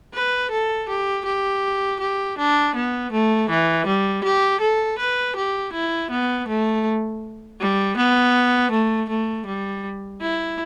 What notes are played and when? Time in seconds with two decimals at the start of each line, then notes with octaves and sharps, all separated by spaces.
0.14 B4
0.51 A4
0.89 G4
1.25 G4
2.00 G4
2.38 D4
2.75 B3
3.12 A3
3.50 E3
3.87 G3
4.24 G4
4.61 A4
4.99 B4
5.36 G4
5.73 E4
6.11 B3
6.48 A3
7.60 G3
7.97 B3
8.72 A3
9.09 A3
9.46 G3
10.21 E4